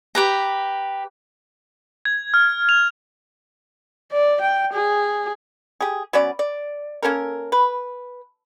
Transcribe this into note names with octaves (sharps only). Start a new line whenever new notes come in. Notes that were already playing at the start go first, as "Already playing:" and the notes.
G4 B4 A#5
G#6
F6
F7
D5
G5
G#4
G4 G#4
F#3 B3 C#4 D5
D5
A#3 C#4 A4 A#4
B4